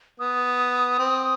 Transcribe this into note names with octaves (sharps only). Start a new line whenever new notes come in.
B3 D#6
C4